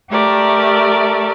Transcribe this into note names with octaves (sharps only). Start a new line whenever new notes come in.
A3 G4 A#4 D5 E5